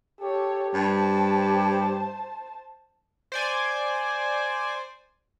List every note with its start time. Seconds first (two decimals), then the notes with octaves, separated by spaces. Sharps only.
0.21 G4 A4 C#5
0.74 G2 C5 A5
3.32 C5 D5 G#5